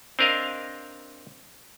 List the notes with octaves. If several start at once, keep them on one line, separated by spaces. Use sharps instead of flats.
C4 D4 A#4 D#5 F5